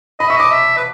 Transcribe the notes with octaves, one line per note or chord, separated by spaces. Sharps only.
D#5 B5
E5 C#6
D#5 D6
E5
B4